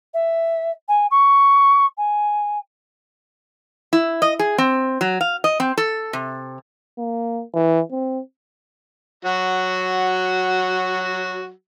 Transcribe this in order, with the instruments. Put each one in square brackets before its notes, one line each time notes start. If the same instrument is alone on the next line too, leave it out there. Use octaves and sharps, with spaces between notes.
[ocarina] E5
G#5
C#6
G#5
[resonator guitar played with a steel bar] E4
D#5
G#4
C4
F#3
F5
D#5
C4
A4
C3
[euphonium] A#3
E3
C4
[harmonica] F#3 F#4 [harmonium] F#5